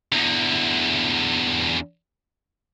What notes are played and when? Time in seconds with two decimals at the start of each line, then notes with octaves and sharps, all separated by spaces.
0.12 E2 D3